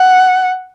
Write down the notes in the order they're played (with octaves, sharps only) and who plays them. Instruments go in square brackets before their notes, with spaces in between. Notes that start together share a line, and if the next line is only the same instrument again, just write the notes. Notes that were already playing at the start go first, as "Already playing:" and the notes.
Already playing: [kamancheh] F#5